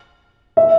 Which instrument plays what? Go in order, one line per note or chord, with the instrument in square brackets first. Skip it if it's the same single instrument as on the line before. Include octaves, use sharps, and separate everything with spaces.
[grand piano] E5